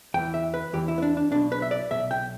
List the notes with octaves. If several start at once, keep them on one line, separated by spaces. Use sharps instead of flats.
E2 E3 G5
E5
B4
E2 E3 G4
E4
B3
D4
D4
B1 B2 D4
B4
E5
D5
B1 B2 E5
G5